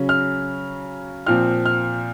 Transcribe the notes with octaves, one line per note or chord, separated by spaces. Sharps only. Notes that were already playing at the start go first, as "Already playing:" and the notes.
Already playing: C#3 F#3 C#4
F6
A#2 F3 C4 F6
F6